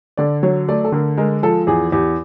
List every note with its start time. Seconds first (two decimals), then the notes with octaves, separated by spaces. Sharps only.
0.17 D3 D5
0.43 F#3 C#5
0.69 A3 D5
0.84 A4
0.92 D3 A#4
1.17 G#3 A#4
1.43 F3 A4
1.67 E2 G#4
1.92 E2 G4